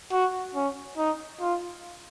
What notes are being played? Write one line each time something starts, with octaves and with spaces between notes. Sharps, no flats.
F#4
C#4
D#4
F4